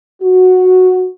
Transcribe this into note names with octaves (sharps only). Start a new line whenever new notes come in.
F#4